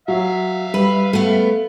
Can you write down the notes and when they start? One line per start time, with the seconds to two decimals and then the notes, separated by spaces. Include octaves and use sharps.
0.08 F#3 E5 F5
0.74 G3 B4 B5
1.13 A3 B3